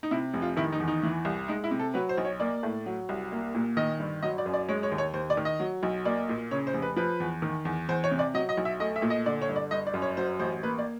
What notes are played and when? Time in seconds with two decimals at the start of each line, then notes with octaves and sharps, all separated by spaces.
0.03 D#4
0.11 C3 E4
0.34 F1
0.42 F4
0.57 D#3 E4
0.72 D#4
0.80 E2
0.88 D#4
1.03 E3
1.25 C2
1.48 G#3 D#4
1.64 E4
1.71 C3
1.79 A4
1.94 F#3 B4
2.09 C5
2.18 B1
2.25 C#5
2.40 A#3 D5
2.63 A2
2.86 F#3
3.09 C2
3.32 A#3
3.55 A#2
3.77 D#3 D#5
3.99 G1
4.23 F#3 D#5
4.38 D5
4.46 F#2
4.54 D5
4.69 G#3 C#5
4.83 C#5
4.91 D#2
4.98 C#5
5.14 D#2 C5
5.30 D5
5.37 D#3
5.45 D#5
5.60 F#3
5.83 B1
6.05 A#3 D5
6.29 A#2
6.51 C#3 C#5
6.67 C5
6.74 F1
6.82 B4
6.96 F3 B4
7.20 E2
7.42 D#3
7.65 E2
7.89 E2 C5
8.04 C#5
8.11 C3
8.19 D5
8.34 F#3 D#5
8.49 D#5
8.57 B1
8.65 E5
8.80 A3 D#5
8.96 E5
9.02 A#2
9.10 D#5
9.26 D3 D5
9.42 C#5
9.49 G1
9.56 D5
9.71 G1 D#5
9.87 D5
9.94 F#2
10.02 C#5
10.17 F#3 C5
10.39 A1 C5
10.63 A#3 B4
10.78 D5